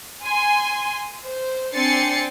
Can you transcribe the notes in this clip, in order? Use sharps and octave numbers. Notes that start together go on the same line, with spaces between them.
G#5 C6
C5
C4 D4 G#5 A6 C7 C#7